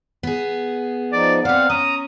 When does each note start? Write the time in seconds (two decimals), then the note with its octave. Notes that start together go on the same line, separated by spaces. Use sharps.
0.23 B3 G#4
1.12 F3 D#4 D5
1.45 C4 B4 C5 D5 F5 F#5
1.70 C#4 A#5 D#6